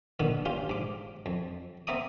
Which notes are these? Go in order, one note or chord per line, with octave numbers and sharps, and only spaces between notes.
A#2 D3 D#3 B3
G2 C#4 F4 G4
G#2 D6
F2
B3 C4 E5 A#5 D6 D#6